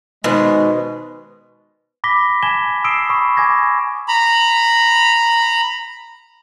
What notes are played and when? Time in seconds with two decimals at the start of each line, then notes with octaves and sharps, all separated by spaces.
0.24 B2 D#3 G#3 B4 C5
2.04 B5 D6 A#6 B6 G7
2.43 G#5 A5 G#6 B6 E7 G7
2.84 D#6 E6 C7 D7 E7 G7
3.10 B5 C#6 D#6
3.37 G#5 D6 G#6 A#6
4.08 A#5 B5